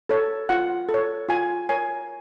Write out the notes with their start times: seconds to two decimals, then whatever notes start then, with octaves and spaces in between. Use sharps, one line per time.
0.09 A4 C#5
0.49 F4 F#5
0.89 A4
0.94 C#5
1.29 F4 G#5
1.69 A#4 C#5 G#5